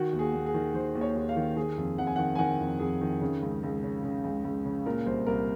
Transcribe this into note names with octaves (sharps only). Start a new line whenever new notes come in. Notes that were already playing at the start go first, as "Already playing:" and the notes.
Already playing: D#3 F#4
D#2
G#4
D#2
G#4
D#3
D#3 C5
D#2
C#5
D#2
F5
D#3
D#3 G#4
F2
F2 F#5
G#5
D#3 F#5
G#5
D#3 F#5
F2
F2 G#4
D#3
C#3
C#2
C#2
C#3
C#3
C#2
C#2
C#3
A#2 A#4
C2 C5
C2 A#4